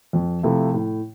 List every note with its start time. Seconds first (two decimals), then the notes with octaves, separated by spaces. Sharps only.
0.13 F2
0.43 C3 F3 A3 E4
0.74 A2